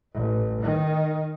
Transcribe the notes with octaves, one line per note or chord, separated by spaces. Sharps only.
A1
D#3